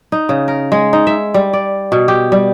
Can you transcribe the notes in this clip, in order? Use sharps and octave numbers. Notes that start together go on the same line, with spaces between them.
D#4
C#3
A#4
G#3
D#4
E5
G3
D5
B2
G4
G3